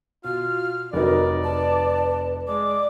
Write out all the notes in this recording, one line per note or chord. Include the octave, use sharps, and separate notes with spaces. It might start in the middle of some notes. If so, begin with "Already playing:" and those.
B2 F4 F#4 F6
F1 F#3 D#4 A#4 B4 D5
B4 A5
G#3 D5 D6